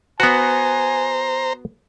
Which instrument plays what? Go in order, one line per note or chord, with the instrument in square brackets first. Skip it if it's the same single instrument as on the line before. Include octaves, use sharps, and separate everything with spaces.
[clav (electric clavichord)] B3 F#4 [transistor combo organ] C5 A#5 [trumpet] G#5